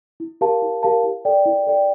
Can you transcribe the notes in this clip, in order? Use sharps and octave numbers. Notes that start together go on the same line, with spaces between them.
E4
G4 A#4 F5 A5
E4
G4 A#4 F5 A5
E4
A4 D5 G5
E4
A4 D5 G5